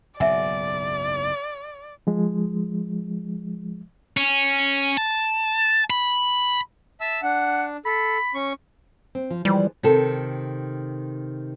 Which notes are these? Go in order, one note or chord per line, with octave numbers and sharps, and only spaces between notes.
F#1 B1 G#2 D5 E5 F#5 G#5
F3 G#3
C#4
A5
B5
E5 A5 E6
D4 F#5
A4 B5
C#4 C#6
C4
F3
E3 F3 G3 G#3
C3 D#3 A4